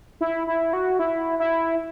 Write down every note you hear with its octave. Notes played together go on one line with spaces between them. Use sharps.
E4
E4
F#4
E4
E4